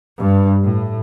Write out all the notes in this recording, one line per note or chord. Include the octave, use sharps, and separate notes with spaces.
G2
A2